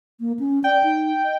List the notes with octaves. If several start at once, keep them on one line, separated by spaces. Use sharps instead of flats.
A#3
C#4
D5 G5
D#4
D#5